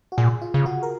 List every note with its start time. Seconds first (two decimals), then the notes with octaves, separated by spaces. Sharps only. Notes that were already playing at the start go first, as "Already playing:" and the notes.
0.12 F#4
0.18 A#2 G#4
0.42 F4
0.54 C#3
0.66 F#4
0.83 A#4